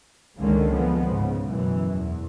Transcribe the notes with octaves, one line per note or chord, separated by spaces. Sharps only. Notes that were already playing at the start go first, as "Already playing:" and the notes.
C#2 D3 D#3 G#3 A#3 C#4
F3 G#3 B3 C4
G#2 C#3
F#2 B2 E3
E2